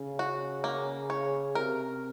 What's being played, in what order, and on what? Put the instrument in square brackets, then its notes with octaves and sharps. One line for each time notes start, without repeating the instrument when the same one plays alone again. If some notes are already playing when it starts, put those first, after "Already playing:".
Already playing: [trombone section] C#3
[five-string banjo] F#4
A#3
C#5
[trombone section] C3 [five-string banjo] A#4